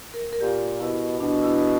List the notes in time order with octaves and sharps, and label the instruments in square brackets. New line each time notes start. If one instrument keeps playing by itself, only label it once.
[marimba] A#4
A#4
[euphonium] A#2 [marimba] G4
[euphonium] B2 [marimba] E4
[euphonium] B2 [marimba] D4
[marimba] E4
D4